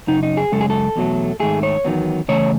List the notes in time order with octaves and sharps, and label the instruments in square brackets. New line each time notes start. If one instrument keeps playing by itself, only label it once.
[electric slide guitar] F#2 C#3 D#4
D#4
G#4
F#2 C#3 G#3 A4
G#4
A4
E2 B2 F#3 A3
G#2 D#3 A3 G#4
C#5
E2 D#3 F#3 B3
C#3 E3 A3 C#5